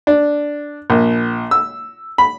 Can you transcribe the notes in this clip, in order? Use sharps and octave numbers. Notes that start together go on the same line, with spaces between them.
D4
A#1
E6
B5